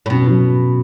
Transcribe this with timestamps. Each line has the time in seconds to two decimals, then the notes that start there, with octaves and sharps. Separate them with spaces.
0.06 A2
0.10 F#2 B2
0.27 F#3